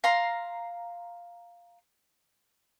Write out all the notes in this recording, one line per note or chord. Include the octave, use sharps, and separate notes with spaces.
F5 A#5 C6